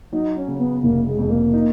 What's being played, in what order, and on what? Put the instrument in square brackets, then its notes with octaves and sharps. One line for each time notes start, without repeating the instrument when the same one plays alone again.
[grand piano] F#3 [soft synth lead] D#4
[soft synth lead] C#4
[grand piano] C#3
[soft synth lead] B3
[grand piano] F1 [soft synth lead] A#3
[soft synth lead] G#3
[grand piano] F2 [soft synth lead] G#3
[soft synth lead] A#3
[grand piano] D#4